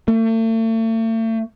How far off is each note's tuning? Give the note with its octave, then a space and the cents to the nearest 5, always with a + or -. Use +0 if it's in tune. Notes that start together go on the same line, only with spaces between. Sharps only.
A3 +40